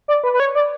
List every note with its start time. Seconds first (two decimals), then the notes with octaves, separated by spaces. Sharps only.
0.08 D5
0.24 B4
0.34 B4
0.40 C#5
0.55 D5